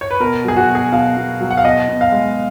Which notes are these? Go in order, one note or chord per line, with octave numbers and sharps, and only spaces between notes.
C#5
B4
B2 A#4
F#3 G#4
F#4
B2
G#4
B2 F5
B2
F#3
F#5
F5
B2 D#5
B2
F5
G#3